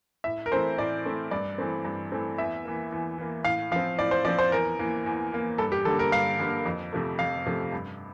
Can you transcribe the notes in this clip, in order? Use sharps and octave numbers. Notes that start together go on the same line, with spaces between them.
A2 E5
A#4
E3 A3 C4 C5
A2 D5
E3 A3 C4
G2 D5
E3 A3 C4
G2
E3 A3 C4
E2 E5
E3 A#3
E2
E3 A#3
A2 F5
F3 C4 F5
A2 D5
C5
F3 C4 D5
C5
E2 A#4
E3 A#3
E2
E3 A#3
G2 A4
G4
D3 G3 A#3 A4
A#4
G2 F5
D3 G3 A#3
F2
C3 F3 A3
F2 F5
C3 F3 A3
G2